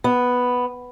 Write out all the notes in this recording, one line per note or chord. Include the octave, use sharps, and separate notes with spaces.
B3